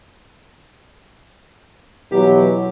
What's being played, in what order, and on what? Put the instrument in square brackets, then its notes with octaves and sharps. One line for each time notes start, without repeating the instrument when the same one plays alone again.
[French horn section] B2 E3 F#3 [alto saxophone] G4